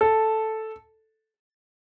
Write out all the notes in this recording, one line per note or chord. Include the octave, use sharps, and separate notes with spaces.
A4